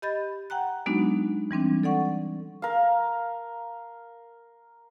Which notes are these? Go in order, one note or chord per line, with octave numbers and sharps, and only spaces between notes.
G4 D#5 B5 G6 A6
F#5 G5 A#5 F#6
F#3 G#3 B3 D4 D#4 F#4
E3 G3 C4 D4
A4 D5 F#5 C#6
A#4 F5